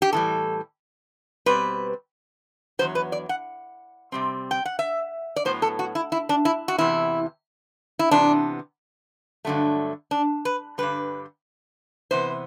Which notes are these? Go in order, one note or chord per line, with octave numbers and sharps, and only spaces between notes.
G4
A2 E3 G3 A4
B2 G3 C4 B4
E2 C3 F#3 C5
B4
D5
F#5
C3 G3 C4
G5
F#5
E5
D5
A2 F#3 B3 C5
A4
F#4
E4
E4
D4
E4
F#4
E2 C3 E3 E4
E4
C3 E3 B3 D4
G2 D3 F#3 A3
D4
B4
G2 D3 G3 B4
C3 E3 B3 C5